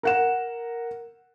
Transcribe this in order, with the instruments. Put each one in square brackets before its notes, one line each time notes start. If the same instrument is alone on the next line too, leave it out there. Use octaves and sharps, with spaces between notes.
[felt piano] A#4 F#5 E7